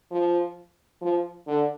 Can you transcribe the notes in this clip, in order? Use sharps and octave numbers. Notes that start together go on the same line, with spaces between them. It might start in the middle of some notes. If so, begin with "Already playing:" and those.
F3
F3
D3